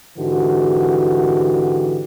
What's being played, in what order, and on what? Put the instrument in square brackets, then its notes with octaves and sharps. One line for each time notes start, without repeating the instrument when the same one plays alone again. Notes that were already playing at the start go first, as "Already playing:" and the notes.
[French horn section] G#2 D3 E3 F#4 G4